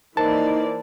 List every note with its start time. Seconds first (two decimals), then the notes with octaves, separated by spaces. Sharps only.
0.17 E3 A#3 D#4 A#4 C5 D5 A5